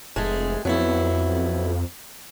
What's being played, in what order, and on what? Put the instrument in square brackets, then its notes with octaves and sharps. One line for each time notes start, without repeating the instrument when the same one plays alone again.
[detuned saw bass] F1 [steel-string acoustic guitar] G#3 A3 G#4
[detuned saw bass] F2 [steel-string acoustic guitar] F#3 B3 E4